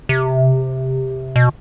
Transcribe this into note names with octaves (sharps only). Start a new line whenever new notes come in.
C3
B2